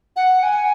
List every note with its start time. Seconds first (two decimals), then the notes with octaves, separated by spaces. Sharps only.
0.16 F#5
0.43 G#5